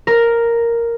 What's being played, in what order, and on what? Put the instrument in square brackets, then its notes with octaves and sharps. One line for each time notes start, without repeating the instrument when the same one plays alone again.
[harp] A#4